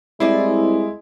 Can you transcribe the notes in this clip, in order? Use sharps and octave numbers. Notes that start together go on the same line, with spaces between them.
C2 G#3 E4 C5 D5 D#5